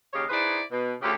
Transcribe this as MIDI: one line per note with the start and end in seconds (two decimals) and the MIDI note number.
0.13 0.24 39
0.13 0.24 49
0.13 0.24 67
0.13 0.24 73
0.13 0.24 75
0.13 0.24 77
0.30 0.60 63
0.30 0.60 64
0.30 0.60 68
0.30 0.60 71
0.30 0.60 72
0.30 0.60 74
0.71 0.92 47
1.02 1.13 38
1.02 1.13 49
1.02 1.13 67